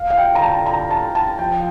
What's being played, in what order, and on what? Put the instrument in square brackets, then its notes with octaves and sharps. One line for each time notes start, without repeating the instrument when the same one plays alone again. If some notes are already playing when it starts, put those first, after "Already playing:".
Already playing: [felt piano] F5
F5
G5
[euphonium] D3
[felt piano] A#5
A5
A#5
A5
A5
[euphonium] F3 [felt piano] G5